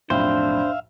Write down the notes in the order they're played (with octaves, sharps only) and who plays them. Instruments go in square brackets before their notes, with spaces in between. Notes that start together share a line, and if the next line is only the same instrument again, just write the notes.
[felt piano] B1 F2 A2 [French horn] D4 [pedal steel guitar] C5 [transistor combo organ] E5 F5